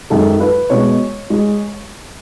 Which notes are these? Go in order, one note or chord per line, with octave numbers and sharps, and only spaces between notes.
F#2 D#3 G#3 A4
B4
B2 G#3 C#5
G#3